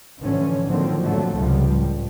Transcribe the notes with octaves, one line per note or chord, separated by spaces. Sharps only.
A2 D3 E3 F3 C#4
D3 D#3 F3 F#3 A#3 C4
A2 D3 F3 F#3 A3
C#2 C3 F3 G3
A2